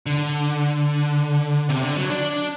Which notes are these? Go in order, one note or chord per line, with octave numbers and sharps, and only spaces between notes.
D3
C3
D3
F#3
D4